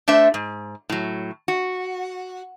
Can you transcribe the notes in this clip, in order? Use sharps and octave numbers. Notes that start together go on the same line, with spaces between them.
A3 D4 C5 E5
G#2
A2 F#3
F#4